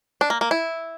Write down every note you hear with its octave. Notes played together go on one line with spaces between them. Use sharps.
D4
A#3
A#3
E4